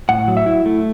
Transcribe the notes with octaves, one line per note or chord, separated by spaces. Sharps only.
A2 F#5
F#3
E5
E4
A3